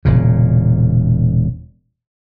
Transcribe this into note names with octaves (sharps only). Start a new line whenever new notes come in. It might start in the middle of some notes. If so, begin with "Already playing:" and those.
E1 A#2 C#3